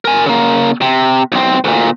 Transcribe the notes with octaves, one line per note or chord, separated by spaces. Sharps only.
A#4 G#5
C#3 A#3
C3
B1 C4
D2 A#2